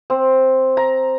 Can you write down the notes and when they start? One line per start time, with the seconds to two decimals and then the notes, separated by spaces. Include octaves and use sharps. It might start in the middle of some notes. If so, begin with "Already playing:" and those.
0.10 C4
0.77 A#5